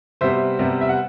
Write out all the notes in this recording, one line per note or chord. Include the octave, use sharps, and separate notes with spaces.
C3 G3 B3 C5 E5
C3 G3 B3
E5
F#5